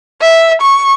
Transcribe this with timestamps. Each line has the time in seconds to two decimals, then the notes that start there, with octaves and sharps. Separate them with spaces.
0.22 E5
0.61 C#6